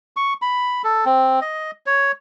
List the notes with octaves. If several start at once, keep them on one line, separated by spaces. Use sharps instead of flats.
C#6
B5
A4
C4
D#5
C#5